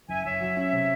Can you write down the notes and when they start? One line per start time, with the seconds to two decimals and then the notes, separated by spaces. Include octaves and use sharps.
0.08 F#1 E5 G#5
0.25 F#1 C#5 E5
0.41 F#3
0.57 C#4
0.73 C3